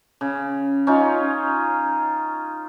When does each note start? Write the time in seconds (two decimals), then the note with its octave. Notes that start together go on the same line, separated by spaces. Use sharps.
0.21 C#3
0.87 C#4 D#4 F4